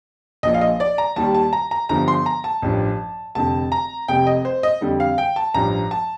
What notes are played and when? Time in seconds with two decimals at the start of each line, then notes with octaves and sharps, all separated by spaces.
0.43 A#1 A#2 F3 D#5
0.54 F5
0.61 D#5
0.80 D5
0.98 A#5
1.16 D#2 D#3 G3 A5
1.35 A5
1.53 A#5
1.71 A#5
1.89 G1 G2 D3 F3 A#5
2.08 C6
2.26 A#5
2.44 A5
2.62 A1 G2 F3
3.35 F1 F2 D3 A5
3.72 A#5
4.08 F1 F2 C3 G5
4.27 D#5
4.45 C5
4.63 D#5
4.81 F2 D3 G3
5.00 F5
5.18 G5
5.36 A5
5.54 A1 G2 F3 A#5
5.91 A5